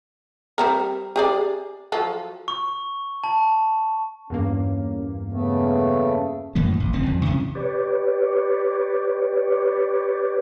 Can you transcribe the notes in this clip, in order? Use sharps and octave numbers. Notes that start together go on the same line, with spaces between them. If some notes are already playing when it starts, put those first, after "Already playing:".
G3 C4 A#4
G4 G#4 D5
F3 F#3 A4
C#6
A5
E2 G2 A#3 C#4
C#3 A3 B3
F#2 A2 E3 A#3
E1 A1
F1 C#3 C4
C2 F2
C3 E3 F3 C#4
G4 B4 C#5 D5